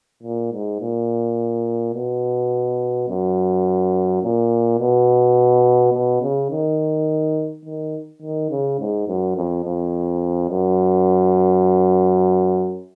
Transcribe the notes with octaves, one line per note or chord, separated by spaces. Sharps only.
A#2
G#2
A#2
B2
F#2
A#2
B2
B2
C#3
D#3
D#3
D#3
C#3
G#2
F#2
F2
F2
F#2